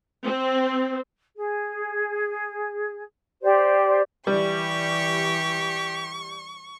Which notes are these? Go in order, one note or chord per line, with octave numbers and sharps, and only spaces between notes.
C4
G#4
G4 C5 D5
E3 G3 G4 C#6